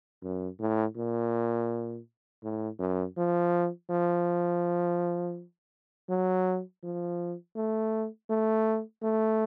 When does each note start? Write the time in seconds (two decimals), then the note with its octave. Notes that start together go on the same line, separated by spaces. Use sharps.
0.23 F#2
0.59 A2
0.96 A#2
2.43 A2
2.79 F#2
3.17 F3
3.90 F3
6.10 F#3
6.84 F3
7.56 A3
8.30 A3
9.02 A3